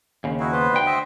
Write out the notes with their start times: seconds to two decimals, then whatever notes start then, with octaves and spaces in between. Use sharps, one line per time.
0.24 D#2 C#3
0.40 D#4 E4 F#4
0.52 B3 B4 C5
0.73 D2 G5
0.86 C5 D#5 E5